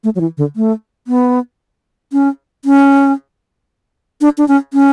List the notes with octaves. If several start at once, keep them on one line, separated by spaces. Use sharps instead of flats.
A3
F#3
E3
D3
A3
B3
C#4
C#4
D4
D4
C#4
C#4